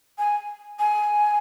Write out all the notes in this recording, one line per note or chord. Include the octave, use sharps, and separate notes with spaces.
G#5
G#5